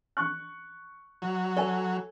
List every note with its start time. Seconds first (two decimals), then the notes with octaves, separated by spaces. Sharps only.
0.17 C#6 F#6
1.22 F#3
1.57 A4 C#5 G#5